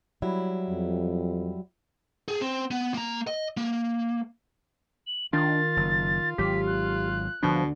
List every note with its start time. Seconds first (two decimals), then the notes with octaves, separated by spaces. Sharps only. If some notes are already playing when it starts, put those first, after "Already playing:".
0.22 F#3 G3 E4
0.69 F2
2.28 G#4
2.41 C4
2.71 B3
2.94 A#3 A#5
3.27 D#5
3.57 A#3
5.07 F#7
5.33 D#3 D4 F4 A6
5.77 F#1
6.38 G#1 F#3 G4 B6
6.67 F#6
7.43 D2 B2 D3 F3 D4